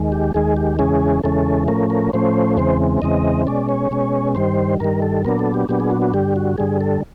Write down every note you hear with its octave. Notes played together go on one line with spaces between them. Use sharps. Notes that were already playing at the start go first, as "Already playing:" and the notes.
Already playing: D#2 D#3 G#3
G4
D#2 D#3 G#3 G#4
G4
E2 C#3 E3 G#3 C#4 G#4
E2 C#3 E3 G#3 C#4 A4
A2 F3 A3 C#4 A#4
A#4
A2 F3 A3 C#4 C5
E2 C#3 E3 G#3 C4 C5
E2 C#3 E3 G#3 C4 D#5
B2 G#3 C#4 D5
C#5
B2 G#3 C#4
G2 D#3 G3 C5
G2 D#3 G3 A#4
A4
A#2 F#3 B3 D4 A#4
A4
G4
A#2 F#3 B3 D4 G4
G#4
F#4
F#4
G2 D3 G3 G4
F#4
G2 D3 G3 G#4
A4